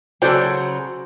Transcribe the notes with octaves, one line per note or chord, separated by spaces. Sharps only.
C#3 F#3 F#4 A4 C5 D5 G5